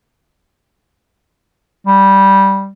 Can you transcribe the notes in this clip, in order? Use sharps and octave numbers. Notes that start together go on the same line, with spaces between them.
G3